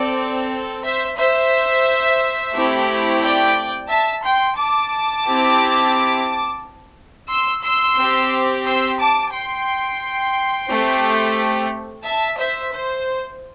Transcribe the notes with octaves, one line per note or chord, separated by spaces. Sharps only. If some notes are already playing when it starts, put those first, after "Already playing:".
Already playing: C4 A4 D5
C5 E5
C5 E5
A3 C4 E4 G4
D5 G5
E5 A5
G5 C6
A5 D6
C4 E4 G4
C6 E6
C6 E6
C4 G4
C6 E6
A5 D6
G5 C6
A3 C4 G4
E5 A5
C5 E5
C5